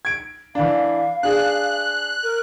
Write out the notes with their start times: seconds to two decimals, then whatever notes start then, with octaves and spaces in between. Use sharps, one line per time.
0.05 G#6 D7
0.55 E3 D4 F5
1.23 D4 G#4 F#6
2.23 A#4